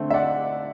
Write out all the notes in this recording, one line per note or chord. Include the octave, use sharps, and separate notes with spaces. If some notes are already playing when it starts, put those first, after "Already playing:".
Already playing: D3 A3 C4
E5
D5 F#5